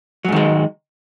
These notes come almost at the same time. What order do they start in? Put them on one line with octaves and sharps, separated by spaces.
F#3 G#2 D#3 G#3